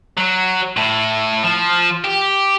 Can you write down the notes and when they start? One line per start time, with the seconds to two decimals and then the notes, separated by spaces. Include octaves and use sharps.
0.17 F#3
0.77 A2
1.43 F3
2.04 G4